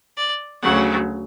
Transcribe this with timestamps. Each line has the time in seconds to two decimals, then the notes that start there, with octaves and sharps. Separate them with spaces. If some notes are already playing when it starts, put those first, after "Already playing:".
0.17 D5
0.63 D2 C#3 F#3 F#5